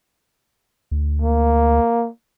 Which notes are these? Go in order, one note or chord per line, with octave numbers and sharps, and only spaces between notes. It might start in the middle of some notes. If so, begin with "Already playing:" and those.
D2
A#3